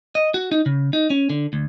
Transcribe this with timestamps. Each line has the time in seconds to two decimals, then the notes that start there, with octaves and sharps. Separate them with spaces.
0.15 D#5
0.34 F#4
0.52 D#4
0.66 C#3
0.93 D#4
1.10 C#4
1.30 D3
1.53 D2